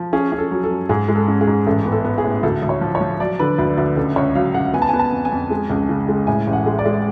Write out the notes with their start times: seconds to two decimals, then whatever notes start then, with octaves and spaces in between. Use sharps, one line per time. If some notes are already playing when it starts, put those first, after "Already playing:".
Already playing: F3
0.13 C#4 G#4
0.32 C#4
0.38 A4
0.51 F#3
0.64 A4
0.70 F#2
0.89 G#2 G#4
1.09 G#3
1.15 A4
1.28 C#4
1.41 G#4
1.47 G#2
1.67 A1 A4
1.86 B3
1.92 A4
2.05 B3
2.18 G#4
2.24 A2
2.43 D2 A4
2.63 D2
2.69 C#5
2.81 F3
2.95 C#5
3.01 F3
3.20 F#3 D5
3.39 D3 B4
3.58 D2 B4
3.78 D2 B4
3.97 C#2 A4
4.16 C#2 C#5
4.35 F#3 F5
4.54 C#2 F#5
4.73 B3 G#5
4.82 A5
4.89 G#5
4.93 B3
4.99 A5
5.12 F2
5.25 G#5
5.32 F2
5.50 G#3
5.70 C#2
5.89 C#3
6.09 G#3
6.27 A2 G#5
6.47 A1
6.53 F#5
6.66 G#3
6.79 D5
6.86 G#3